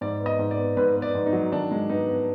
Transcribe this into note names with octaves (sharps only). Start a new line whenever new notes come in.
G#2 D5
B3
D#5
G#2
D5
B3
G#2 B4
B3
D5
G#2
D#4
F#3
D#3 D4
G#3
B3 D#4
B3